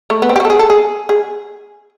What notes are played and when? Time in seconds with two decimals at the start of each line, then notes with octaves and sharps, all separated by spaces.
0.10 A3
0.22 B3
0.29 C4
0.36 G4
0.40 F#4
0.45 A4
0.50 G#4
0.59 A4
0.70 G#4
1.09 G#4